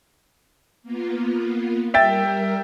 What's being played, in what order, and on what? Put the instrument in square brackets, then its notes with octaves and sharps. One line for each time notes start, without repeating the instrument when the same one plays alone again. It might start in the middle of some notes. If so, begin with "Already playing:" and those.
[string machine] A#3 B3 F4
[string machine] G3 A#4 [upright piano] E5 G5 A6